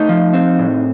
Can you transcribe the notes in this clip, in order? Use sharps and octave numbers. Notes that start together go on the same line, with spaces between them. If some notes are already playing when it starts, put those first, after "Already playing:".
Already playing: A3 D#4
F3
C4
A2